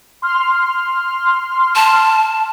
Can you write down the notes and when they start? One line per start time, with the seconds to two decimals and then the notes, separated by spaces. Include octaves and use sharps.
0.22 C6 F6
1.76 A5